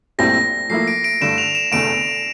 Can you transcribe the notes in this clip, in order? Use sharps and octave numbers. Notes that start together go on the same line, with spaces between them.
A#1 A2 G3 C4 E4 A#6
A2 F3 A#3 E4 C7
D7
D7
G2 D3 A3 E7
F7
E7
F1 E2 D3 A3 D7